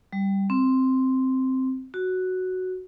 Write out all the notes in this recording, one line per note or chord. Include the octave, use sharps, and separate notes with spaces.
G3
C4
F#4